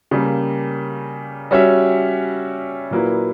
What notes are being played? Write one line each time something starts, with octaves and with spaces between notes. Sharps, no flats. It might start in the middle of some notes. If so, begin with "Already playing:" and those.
C#3 G3 A#3
G3 C#4 F#4 C#5 E5
A#2 F#3 A#3 E4 B4